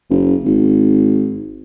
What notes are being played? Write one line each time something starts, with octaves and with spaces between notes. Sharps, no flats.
F#1
G#1